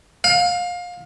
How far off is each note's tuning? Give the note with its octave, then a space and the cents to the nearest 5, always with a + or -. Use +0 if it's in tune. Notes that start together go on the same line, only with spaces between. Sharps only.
F5 +25